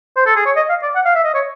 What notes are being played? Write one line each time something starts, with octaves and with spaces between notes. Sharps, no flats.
C5
A4
G#4
C#5
D#5
F5
D5
F#5
F5
E5
D#5
C#5